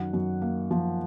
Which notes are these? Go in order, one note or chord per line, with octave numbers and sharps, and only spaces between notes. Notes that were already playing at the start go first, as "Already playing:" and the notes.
Already playing: F#2 D#3 F#5
F#2
A#3
F3